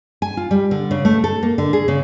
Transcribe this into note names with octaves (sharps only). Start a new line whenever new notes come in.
G#5
F4
G3
D3
C#3
A3
A4
A#3
D3
G#4
C#3